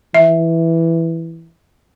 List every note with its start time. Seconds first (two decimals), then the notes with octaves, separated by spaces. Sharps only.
0.14 E3 E5